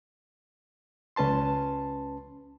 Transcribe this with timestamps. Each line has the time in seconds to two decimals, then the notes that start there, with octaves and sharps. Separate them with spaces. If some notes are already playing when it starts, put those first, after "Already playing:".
1.16 C#2 C#4 B4 A5 C6